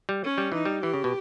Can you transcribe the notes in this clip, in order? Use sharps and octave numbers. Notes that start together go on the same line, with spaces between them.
G3
C#4
G3
E3 D#4
G3
E3 G4
C#3
B2